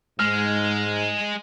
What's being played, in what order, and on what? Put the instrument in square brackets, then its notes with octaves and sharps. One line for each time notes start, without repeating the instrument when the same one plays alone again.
[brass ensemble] G#2 [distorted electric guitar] G#3 [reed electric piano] F6